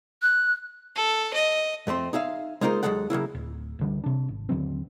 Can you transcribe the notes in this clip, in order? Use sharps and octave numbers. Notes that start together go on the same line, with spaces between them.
F#6
A4
D#5
F2 A3 C4 C6
D#4 G#4 E5 F5
G#3 A#3 D#4 F4 A#4 C5
D#2 B2 F#3 G#3 A4 F#5
C#3 F#3 A#3 E4
D1
C#2 D3 G3
C3 D4
G#1
D#2 D3 F#3 C4